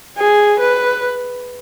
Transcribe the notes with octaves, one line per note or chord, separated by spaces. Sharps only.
G#4
B4